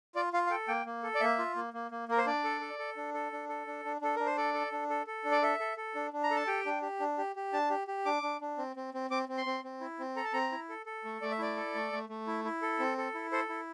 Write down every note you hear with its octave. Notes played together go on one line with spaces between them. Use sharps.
F4 D5
F4 F5
F5
A4 G5
A#3 G5
A#3
A4
D5
A#3 E5
F4
A#3
A#3
A#3
A#3 A#4
C5
D4 D5
A4
A4
A4
D4
A4
D4
A4
D4
D4
D4 A4
D4 A#4
C5
A4 D5
A4
D4
A4
A4
D4
D5
A4 E5
A4
A4
D4
D4
A#5
A4
A5
G4 G5
D4
G4
D4
G4
G4
D4 A5
G4
G4
D4 D6
D4
D4
C4
C4
C4
C4 D6
C4
C6
C4
C4
E4
C4
A4 A#5
A5
C4 A#5
E4
A4
A4
A3
A3 D5
E5
E4 D5
A4
A3
A3
A3
E4
E4
A4
C4
A4
E4
A4 C5
E4